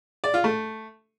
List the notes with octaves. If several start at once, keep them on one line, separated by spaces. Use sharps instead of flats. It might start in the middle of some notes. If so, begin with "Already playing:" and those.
D5
F4
A3